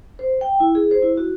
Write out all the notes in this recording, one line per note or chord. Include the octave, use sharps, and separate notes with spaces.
C5
G5
E4
G#4
C5
E4
F#4